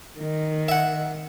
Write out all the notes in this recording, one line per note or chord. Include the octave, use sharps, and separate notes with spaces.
D#3
E5 F#5